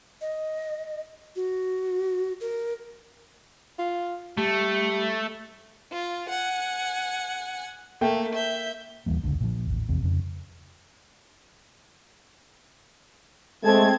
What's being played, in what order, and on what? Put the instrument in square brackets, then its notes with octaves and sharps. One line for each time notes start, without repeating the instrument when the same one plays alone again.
[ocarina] D#5
F#4
A#4
[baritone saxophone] F4
[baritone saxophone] G3 [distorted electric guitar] A3
[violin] F4
F#5 G#5
[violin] A3 [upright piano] A#3 G5
[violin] E5 G6
[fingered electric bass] D#2 E3 G3 A#3
F1 C#2 D3
A#2 F3
A1 D#2
E2 C3
F2 C#3
[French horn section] G#3 A3 [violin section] C4 A5 G#6